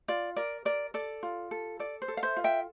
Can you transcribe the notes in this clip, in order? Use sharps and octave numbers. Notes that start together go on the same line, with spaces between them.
F4 D5
A#4 D5
A#4 D5
A4 D5
F4
A4
A4 D5
C5
A4
F5
C5 E5
F4
E5 G5